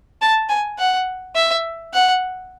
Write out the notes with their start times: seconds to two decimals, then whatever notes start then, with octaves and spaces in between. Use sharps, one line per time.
0.22 A5
0.49 G#5
0.78 F#5
1.36 E5
1.93 F#5